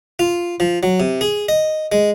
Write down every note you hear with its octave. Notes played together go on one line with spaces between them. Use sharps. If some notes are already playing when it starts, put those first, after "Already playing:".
F4
F3
F#3
C3
G#4
D#5
G#3